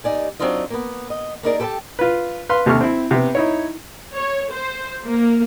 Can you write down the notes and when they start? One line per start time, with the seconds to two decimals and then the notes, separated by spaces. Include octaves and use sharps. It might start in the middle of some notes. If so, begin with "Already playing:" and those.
0.04 D#2 D#4 D5 G#5
0.40 F#3 C4 D4 D#4 F4 D#5
0.70 A#3 B3
1.10 D#5
1.43 A#3 B3 D#4 G#4 A#4 D5
1.60 G4 A4 B4 E5 G5 A5
1.99 F4 B4
2.49 B4 F5 C6
2.66 D#2 C3 A4 C#6 F6
2.81 C4 E4
3.11 C3 B3
3.35 D#4 E4 C#5
4.14 C#5
4.52 C5
5.06 A#3